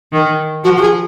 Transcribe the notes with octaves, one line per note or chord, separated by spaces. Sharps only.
D#3
F3 F#4
F#4
G#4